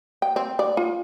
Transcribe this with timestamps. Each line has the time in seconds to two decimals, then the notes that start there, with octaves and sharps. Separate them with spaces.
0.22 G5
0.36 C4
0.59 D5
0.77 F4